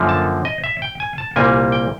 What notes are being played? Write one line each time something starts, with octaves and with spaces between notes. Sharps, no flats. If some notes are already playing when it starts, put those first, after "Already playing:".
Already playing: F#2 D3 F3 A#3
A5
D#5
E5
G5
G#5
A5
C2 A#2 G3 A#3 G#5
G5